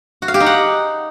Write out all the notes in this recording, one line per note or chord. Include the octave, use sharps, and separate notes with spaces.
F#4
F5
G4
D#4
F#5